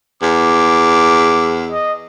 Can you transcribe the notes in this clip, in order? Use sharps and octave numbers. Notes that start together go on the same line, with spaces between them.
E2 D6
D#5